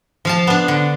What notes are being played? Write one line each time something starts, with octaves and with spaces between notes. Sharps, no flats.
F3 F5 A5
B3 D4
D3